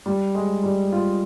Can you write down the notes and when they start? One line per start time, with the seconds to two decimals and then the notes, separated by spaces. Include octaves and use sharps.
0.06 G3
0.35 G#3
0.63 G3
0.92 F4